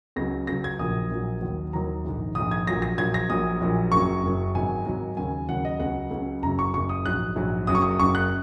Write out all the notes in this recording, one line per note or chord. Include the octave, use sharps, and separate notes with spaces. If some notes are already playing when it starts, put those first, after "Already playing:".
C#2 C#3 F#3 A#6
C#2 C#3 F#3 A#6
G#6
A#1 A#2 F#3 D#6
A#1 A#2 F#3
D#2 D#3 F#3
D#2 D#3 F#3 A#5
A#1 G#2 D#3
A#1 G#2 D#3 D#6
G#6
A#1 A#2 F#3 A#6
A#6
A#1 A#2 F#3 G#6
A#6
A#1 A#2 F#3 D#6
A#1 A#2 F#3
F#1 F#2 F#3 C#6
F#1 F#2 F#3
G#1 G#2 F#3 G#5
G#1 G#2 F#3
D#2 C#3 F#3 G#5
D#2 C#3 F#3 F#5
D#5
C#2 C#3 F#3 F#5
C#2 C#3 F#3
F#1 F#2 C#3 F#3 A#5
C#6
F#1 F#2 C#3 F#3 C#6
D#6
A#1 G#2 F#3 F#6
A#1 G#2 F#3
F#1 F#2 F#3 D#6
C#6
D#6
F#1 F#2 F#3 C#6
F#6